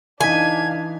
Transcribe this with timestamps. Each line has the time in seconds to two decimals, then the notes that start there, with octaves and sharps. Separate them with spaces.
0.21 E3 D4 D#4 F5 G#5 G#6 B6